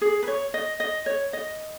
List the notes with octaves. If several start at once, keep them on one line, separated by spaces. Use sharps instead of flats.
G#4
B4
C#5
D#5
D#5
C#5
D#5